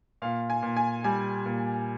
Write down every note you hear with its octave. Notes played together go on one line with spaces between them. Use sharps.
A#2 F5
G#5
A#2
G#5
G3 G#5
A#2